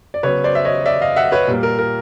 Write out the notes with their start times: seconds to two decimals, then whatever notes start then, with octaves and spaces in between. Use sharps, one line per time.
0.14 D5
0.23 C#3 F#3 B3 B4 C#5
0.44 C5 D5
0.55 E5
0.65 C#5 D#5
0.86 D5 E5
1.01 D#5 F5
1.16 E5 F#5
1.32 B4 C#5
1.48 A#2 G3 A#3
1.63 A#4
1.79 A#4